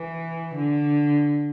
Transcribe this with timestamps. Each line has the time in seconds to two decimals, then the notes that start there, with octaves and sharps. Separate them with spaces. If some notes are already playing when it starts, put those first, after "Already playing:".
Already playing: E3
0.55 D3